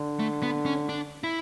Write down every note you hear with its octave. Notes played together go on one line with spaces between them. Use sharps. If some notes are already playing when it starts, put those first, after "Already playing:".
Already playing: D3
A3
B3
C#4
D4
E4